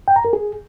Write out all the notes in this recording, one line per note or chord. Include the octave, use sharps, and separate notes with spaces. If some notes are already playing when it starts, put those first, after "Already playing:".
G5
A#5
A#4
G#4